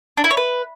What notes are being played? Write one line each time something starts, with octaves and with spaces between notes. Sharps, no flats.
D4
E4
C#5
B4